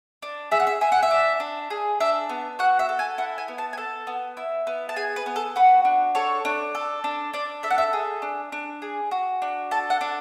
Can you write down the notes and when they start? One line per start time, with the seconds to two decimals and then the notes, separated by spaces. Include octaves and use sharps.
0.22 D4
0.51 G#4 E5
0.60 F#5
0.67 E5
0.81 G#4 E5
0.92 F#5
1.03 E5
1.11 D4
1.40 D4
1.70 G#4
2.00 D4 E5
2.29 B3
2.59 F#4 F#5
2.79 E5
2.89 A4
2.99 G#5
3.18 E4 F#5
3.38 G#5
3.48 B3
3.58 A5
3.73 G#5
3.77 A4 A5
4.07 B3
4.37 E4
4.67 B3
4.89 A5
4.96 G#4 G#5
5.16 B4
5.26 B3
5.36 A4
5.56 F#4 B4
5.85 D4
6.15 A4 C#5
6.45 D4
6.75 A4
7.04 D4
7.33 D4 D5
7.63 A4 E5
7.70 F#5
7.78 E5
7.93 G#4
8.22 D4
8.52 D4
8.82 G#4
9.11 F#4
9.42 D4
9.71 A4 A5
9.90 F#5
10.01 D4